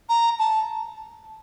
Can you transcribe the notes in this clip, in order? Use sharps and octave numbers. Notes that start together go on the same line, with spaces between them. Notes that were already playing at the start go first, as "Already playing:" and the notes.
A#5
A5